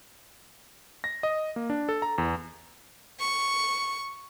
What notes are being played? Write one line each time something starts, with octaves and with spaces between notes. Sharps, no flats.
A#6
D#5
A#3
D4
A4
A#5
E2
C#6